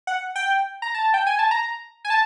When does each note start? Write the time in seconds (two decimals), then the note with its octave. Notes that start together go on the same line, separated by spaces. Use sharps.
0.07 F#5
0.36 G5
0.82 A#5
0.95 A5
1.14 G5
1.27 G#5
1.39 A5
1.51 A#5
2.05 G#5
2.10 A5